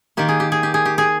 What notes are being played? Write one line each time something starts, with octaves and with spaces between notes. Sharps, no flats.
D#3 A#3 G4
G#4
G4
G#4
G4
G#4
G4
G#4